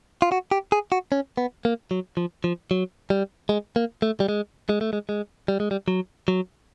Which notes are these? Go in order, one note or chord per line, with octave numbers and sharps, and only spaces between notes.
F4
F#4
G4
G#4
F#4
C#4
B3
A#3
F#3
F3
F3
F#3
G3
G#3
A#3
A3
G3
G#3
G#3
A3
G#3
G#3
G3
G#3
G3
F#3
F#3